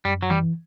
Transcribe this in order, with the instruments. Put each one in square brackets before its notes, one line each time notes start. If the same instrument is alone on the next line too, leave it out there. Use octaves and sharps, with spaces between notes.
[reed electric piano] F#2 [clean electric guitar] G3
[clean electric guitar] F#3
[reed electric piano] E3 [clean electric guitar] G3